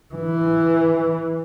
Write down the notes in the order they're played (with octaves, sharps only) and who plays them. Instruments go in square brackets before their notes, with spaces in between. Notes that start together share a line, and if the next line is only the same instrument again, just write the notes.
[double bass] E3